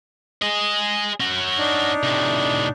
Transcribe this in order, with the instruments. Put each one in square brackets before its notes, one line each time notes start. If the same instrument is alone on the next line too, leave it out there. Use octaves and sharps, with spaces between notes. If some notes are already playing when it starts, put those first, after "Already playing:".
[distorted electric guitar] G#4 D#5
C#4 F#4
[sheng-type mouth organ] D4 D#4
[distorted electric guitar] A2 C3